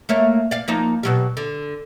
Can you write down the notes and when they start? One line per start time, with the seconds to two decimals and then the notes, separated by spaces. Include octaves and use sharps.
0.09 A3 A#3 C#5
0.51 D5 F5
0.68 F3 A#3 D#4
1.03 B2 F#3 G3
1.37 D3